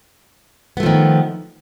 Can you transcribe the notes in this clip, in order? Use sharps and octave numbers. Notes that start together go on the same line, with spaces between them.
D#3 F3 A3 B3